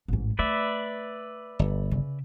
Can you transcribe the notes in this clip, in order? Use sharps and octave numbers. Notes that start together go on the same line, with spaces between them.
A1 G#2
A3 B4 D5 E5
G1
C#3